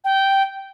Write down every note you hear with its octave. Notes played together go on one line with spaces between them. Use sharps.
G5